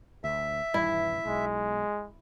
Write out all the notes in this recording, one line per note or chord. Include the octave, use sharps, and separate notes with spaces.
D2 E5
D#1 G2 E3 E4
B1 G#3